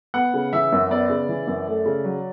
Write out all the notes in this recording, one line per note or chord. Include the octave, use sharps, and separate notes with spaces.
B3 F#5
C#3
E3 E5
F#2
B3 D5
C#3
E3
F#2
A3
C#3
F#3